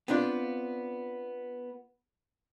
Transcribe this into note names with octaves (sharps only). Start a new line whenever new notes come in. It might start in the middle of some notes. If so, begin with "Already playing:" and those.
B3 C4 D4 F4